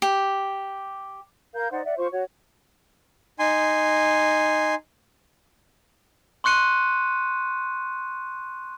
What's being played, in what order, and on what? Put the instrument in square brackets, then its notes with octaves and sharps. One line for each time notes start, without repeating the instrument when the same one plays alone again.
[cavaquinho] G4
[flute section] A#4 F5 G6
D#4 C5 D5 F#5
D5 E5 F#5
F4 C5 C#6
F#4 C#5
[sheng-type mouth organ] D#4 G#5 C6
[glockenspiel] C6 C#6 F#6 C#7 D#7